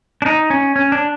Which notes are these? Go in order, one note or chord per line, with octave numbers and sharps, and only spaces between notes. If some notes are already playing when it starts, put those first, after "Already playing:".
D4
D#4
C#4
C#4
D4